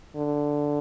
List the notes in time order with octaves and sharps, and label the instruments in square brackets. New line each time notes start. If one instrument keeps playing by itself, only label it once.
[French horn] D3